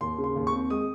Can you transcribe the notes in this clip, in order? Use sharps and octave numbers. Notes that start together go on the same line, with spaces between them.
D#2 C6
C#3
C6
D#2
C#6
C4
G#3 D#6